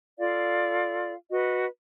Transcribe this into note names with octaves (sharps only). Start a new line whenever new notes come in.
F4 A4 D5 F5
F#4 B4 D#5